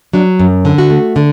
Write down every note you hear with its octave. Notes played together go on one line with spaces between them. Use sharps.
F#3 D4
F#2
D3
F#4
A3
D3